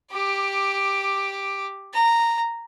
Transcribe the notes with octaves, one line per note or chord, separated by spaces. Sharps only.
G4 D6
A#5